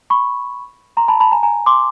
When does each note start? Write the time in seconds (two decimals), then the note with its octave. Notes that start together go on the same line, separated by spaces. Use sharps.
0.10 B5 C#6
0.97 A#5 C6
1.08 A5 B5
1.20 A5 B5
1.32 G#5 A#5
1.43 G#5 A#5
1.66 C6 D6